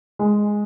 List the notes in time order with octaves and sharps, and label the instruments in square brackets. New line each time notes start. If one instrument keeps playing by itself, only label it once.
[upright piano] G#3